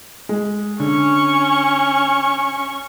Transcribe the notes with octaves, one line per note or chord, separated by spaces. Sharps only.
G#3
D3 C#4 C#6